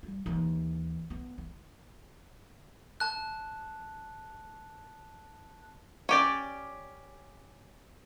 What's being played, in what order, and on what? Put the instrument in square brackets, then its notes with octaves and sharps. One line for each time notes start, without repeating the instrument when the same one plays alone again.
[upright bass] G3 F4
D#2 E3
B3
D#3
[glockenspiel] A5 F#6
[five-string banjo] C#4 G4 D5